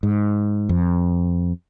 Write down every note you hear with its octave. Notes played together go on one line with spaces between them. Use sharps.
G#2
F2